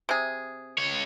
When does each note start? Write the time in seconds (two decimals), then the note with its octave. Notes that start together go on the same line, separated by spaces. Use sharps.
0.09 C3 G#4
0.78 C#2 C#5